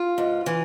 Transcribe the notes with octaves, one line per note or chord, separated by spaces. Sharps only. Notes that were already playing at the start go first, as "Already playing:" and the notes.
Already playing: F4
G#2
E3